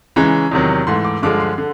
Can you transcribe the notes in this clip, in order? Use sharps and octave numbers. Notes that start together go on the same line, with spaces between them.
C#3 E3 G#3 C#4 A#5
E2 C3 D#3 F#3
G#2 E3 A3 C6
D6
G2 D3 F3 G#3 D6
C6
D3